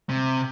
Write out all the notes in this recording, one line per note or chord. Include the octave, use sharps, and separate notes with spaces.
C3